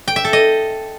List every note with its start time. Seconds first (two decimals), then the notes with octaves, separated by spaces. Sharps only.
0.08 G5
0.16 E5
0.25 A4
0.33 D#5